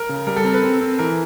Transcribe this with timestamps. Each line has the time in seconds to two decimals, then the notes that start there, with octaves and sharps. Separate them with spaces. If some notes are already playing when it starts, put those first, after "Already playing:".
Already playing: A#4
0.09 C#3
0.27 G3 A#4
0.36 A4
0.45 C4 A#4
0.54 B4
0.64 C4
0.81 C4
0.99 E3 A#4